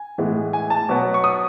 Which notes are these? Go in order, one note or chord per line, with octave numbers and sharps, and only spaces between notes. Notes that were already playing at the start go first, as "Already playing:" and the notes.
Already playing: G#5
A2 E3 G#3 B3
G#5
A5
B2 F#3 B3
C#6
D#6